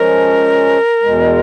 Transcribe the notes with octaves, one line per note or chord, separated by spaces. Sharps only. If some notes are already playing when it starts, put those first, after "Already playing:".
Already playing: F3 G#3 C#4 A#4
E2 B2 G#3